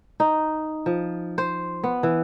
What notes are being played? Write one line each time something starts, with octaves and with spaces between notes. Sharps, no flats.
D#4
F3
C5
B3
E3